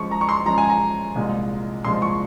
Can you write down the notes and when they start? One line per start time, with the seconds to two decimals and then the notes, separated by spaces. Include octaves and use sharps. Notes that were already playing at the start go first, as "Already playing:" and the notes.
Already playing: F#2 F3 G#3 C#6
0.11 A#5
0.21 C#6
0.29 C6
0.46 F#2 F3 G#3 A#5
0.58 G#5
0.69 A#5
1.15 C2 A#2 F3 G#3
1.84 C2 A#2 F3 G#3 C6
2.02 C#6